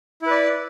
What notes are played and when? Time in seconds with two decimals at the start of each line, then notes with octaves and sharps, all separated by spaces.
0.22 E4
0.26 B4
0.31 D5